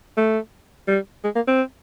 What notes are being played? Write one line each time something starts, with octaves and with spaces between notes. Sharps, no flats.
A3
G3
G#3
A#3
C4